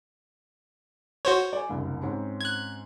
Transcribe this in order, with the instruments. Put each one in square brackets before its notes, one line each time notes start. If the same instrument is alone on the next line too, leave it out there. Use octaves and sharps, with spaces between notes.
[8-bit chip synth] F#4 C5 C#5
[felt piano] D5 G#5
F#1 C2 G2
G#2 C4 C#4
[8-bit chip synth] F#6 G#6